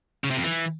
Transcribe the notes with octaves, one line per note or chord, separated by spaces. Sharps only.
C#3
C3
F2
E3